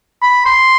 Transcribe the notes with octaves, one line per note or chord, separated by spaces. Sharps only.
B5
C6